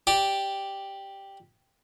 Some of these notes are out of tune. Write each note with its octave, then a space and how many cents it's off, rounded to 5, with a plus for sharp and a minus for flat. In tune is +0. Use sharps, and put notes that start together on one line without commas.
G4 +0 D5 +0